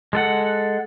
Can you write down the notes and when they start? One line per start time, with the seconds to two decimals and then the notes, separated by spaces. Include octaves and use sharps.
0.13 G#3 A4 F#5